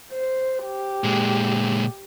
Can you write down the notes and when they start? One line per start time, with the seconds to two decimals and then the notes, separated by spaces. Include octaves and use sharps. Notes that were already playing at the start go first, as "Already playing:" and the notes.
0.12 C5
0.65 G4
1.04 A#2 G#3